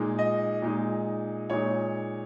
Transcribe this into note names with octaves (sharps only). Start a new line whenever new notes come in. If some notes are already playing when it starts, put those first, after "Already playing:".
Already playing: A#2 G#3 D#4
D#5
A#2 G#3 D#4
A#2 G#3 D#4 C#5